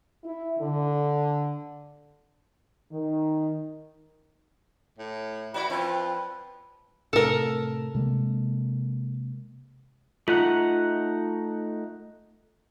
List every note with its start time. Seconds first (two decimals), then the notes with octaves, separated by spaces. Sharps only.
0.24 E4
0.59 D3
2.92 D#3
4.98 A2
5.54 E4 F#4 B4 D5
5.70 F3 C4
7.13 A2 C3 A4 A#4
7.95 C3 G#3 A#3
10.28 A3 D#4 F4 F#5